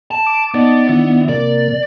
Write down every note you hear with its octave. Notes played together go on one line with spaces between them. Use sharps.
A5
D6
B3 D#4 D5 A5
D#3 D4 E4
C3 A#3 D5